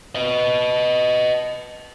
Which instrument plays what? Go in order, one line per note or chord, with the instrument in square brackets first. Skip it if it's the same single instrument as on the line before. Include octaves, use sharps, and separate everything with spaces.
[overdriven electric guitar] B4 D#5